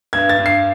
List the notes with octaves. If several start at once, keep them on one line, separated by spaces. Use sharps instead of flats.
G2 G#6
A6
G2
C7